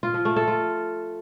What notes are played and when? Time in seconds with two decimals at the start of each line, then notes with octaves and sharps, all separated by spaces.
0.03 F4
0.14 F3
0.25 A3
0.36 A4
0.48 F4